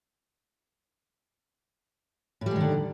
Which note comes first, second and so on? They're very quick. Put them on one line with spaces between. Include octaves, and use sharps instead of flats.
A2 G3 G#3 D#3 D3